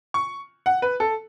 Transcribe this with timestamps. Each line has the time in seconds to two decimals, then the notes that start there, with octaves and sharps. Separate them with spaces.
0.14 C#6
0.66 F#5
0.82 B4
1.00 A4